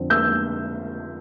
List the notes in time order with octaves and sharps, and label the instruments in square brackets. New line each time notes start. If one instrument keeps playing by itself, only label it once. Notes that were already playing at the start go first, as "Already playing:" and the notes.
Already playing: [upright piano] F2 D3 C4
E6 G6